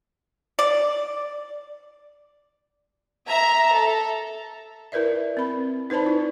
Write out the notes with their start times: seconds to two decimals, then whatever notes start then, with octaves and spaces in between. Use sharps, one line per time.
0.59 D5
3.26 E5 A#5
3.70 A4
4.92 E4 A#4 B4 D5 E5
5.37 C4 B5
5.90 D#4 B4 C5 D5 A5 B5
6.06 E4